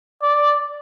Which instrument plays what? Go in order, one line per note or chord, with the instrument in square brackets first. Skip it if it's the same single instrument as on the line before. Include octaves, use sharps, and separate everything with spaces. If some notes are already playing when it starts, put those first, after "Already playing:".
[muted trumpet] D5